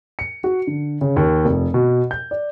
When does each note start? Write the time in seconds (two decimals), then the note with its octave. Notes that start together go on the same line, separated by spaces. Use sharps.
0.19 C#7
0.44 F#4
0.67 D3
1.01 C#3
1.16 D#2
1.45 F1
1.74 B2
2.11 G6
2.31 D5